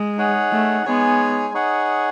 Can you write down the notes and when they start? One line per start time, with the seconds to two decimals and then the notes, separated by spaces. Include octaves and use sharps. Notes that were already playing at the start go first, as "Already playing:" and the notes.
Already playing: G#3
0.17 D#4 G#4 C#5 F#5
0.51 A3
0.85 G#3 B3 D#4 G#4 C#5 G#5
1.54 D#4 G#4 C#5 F#5